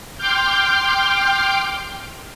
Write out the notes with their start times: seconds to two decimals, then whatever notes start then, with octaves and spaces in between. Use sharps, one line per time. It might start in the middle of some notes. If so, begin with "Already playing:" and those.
0.17 G5 C6 D6 F6 G6